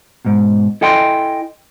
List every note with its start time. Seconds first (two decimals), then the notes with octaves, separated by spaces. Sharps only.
0.25 G#2 B2
0.81 E4 A4 D#5 G5 G#5 C6